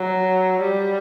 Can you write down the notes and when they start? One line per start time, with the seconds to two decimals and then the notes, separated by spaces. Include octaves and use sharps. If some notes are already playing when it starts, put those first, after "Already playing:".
Already playing: F#3
0.62 G3